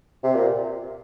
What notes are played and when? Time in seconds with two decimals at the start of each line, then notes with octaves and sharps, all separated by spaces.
0.24 C3
0.34 A#2